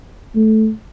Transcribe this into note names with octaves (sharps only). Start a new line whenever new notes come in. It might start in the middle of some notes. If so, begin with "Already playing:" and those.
A3